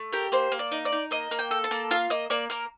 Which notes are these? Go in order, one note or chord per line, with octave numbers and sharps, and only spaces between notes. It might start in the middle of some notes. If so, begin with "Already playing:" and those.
Already playing: A3
G4 A#4
A#3 C5
A#3
D5
D#4
D5
D#4
A#3 D#5
A#3
G5
A4
A5
A#3
F4 F5
A#3 D#5
A#3 D5
A#3 A#4